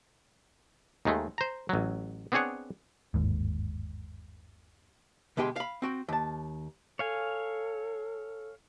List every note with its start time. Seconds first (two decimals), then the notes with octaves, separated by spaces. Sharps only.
1.05 D#2 D#3 G#3 A3
1.38 C5 A#5
1.69 A1 F#3
2.32 B3 C4 D4 G#4 C#5 F#5
3.14 G1 D#2 G#2
5.37 D2 B2 G#3 G4 G5 C6
5.56 F5 B5
5.82 C4 F#4 G5
6.08 D#2 A5
6.99 A4 C#5 F5 G#5